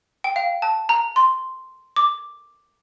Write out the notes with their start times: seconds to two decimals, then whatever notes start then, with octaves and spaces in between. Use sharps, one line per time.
0.24 G5
0.36 F5
0.62 A5
0.89 A#5
1.16 C6
1.96 D6